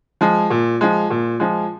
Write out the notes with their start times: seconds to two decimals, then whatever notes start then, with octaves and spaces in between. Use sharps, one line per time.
0.21 F3 G#3
0.50 A#2
0.81 F3 G#3
1.10 A#2
1.40 F3 G#3